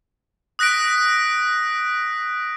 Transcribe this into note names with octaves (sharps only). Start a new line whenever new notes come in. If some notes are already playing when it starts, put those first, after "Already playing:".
D#6 F#6 A#6 B6 D7